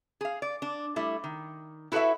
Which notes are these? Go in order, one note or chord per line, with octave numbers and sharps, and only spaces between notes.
G#4 F5
D5
D4
G3 A3 E4
D#3
E4 F#4 A4 B4 C#5 E5